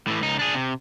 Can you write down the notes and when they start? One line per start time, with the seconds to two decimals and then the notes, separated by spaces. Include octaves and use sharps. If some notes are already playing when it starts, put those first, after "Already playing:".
0.07 A2 E3
0.21 C#2 D#4
0.39 D4 G#4
0.55 C3